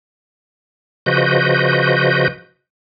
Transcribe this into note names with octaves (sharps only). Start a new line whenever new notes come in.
C#3 F3 F#4 B4 D#5 G6